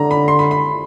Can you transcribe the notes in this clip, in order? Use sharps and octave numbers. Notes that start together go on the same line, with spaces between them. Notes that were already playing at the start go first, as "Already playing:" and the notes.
Already playing: D3 A#5
B5
C6
B5
B5